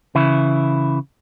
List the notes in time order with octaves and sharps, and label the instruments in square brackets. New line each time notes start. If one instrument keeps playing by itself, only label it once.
[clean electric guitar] C#3 E3 E4